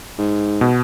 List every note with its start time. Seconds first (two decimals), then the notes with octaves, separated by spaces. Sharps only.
0.18 G#2
0.61 B2